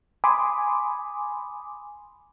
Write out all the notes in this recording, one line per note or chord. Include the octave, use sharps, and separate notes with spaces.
G#5 B5 C6 D6 D#6